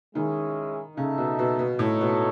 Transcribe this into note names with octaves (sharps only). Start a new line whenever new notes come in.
D#3 G#3 C#4 E4 G#4
C#3 D#4 A4 E5
B2
B2
B2
A2 A3 D#4 F#4 A4 C#5
B2